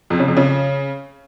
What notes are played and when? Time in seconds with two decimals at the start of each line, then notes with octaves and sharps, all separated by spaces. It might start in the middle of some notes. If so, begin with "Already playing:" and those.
0.10 F2
0.19 C#3
0.28 F2
0.37 C#3